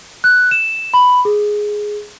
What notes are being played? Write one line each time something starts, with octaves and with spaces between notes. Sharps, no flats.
F#6
E7
B5
G#4